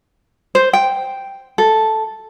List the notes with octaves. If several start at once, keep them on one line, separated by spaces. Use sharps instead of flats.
C5
G5
A4